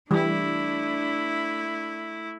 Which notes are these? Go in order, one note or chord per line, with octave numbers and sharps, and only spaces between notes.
E3 G3 A3 D4 E4